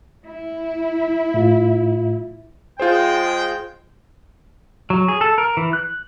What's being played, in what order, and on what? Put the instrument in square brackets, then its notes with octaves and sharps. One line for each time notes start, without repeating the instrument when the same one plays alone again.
[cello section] E4
[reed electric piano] A2 F4
[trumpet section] G#3 G5 [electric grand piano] F4 G#4 C5
[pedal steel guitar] F#3
G#4
A4
A#4
E3
F#6